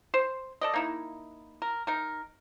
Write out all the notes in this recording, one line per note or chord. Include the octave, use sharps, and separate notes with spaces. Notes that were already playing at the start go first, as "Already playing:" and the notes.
C5
A4 D5 D#5
A#3 D#4 E4
A#4
D#4 A#4